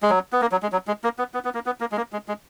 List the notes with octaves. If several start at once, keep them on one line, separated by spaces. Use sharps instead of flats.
G#3
F#3
B3
A#3
F#3
G#3
F#3
G#3
A#3
B3
B3
B3
A#3
B3
A#3
G#3
A#3
G#3
G#3